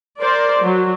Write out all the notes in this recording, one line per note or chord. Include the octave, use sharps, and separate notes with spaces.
A#4 C5 D5
F#3